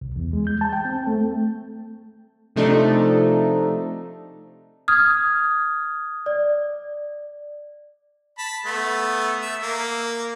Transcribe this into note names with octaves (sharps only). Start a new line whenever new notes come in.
C2
E2
G#3
G6
A5
G5
C4
A3
C3 F3 A3 D4 D#4
D#6 F6 G#6
D5
A5 B5
A3 B3
E5
A#3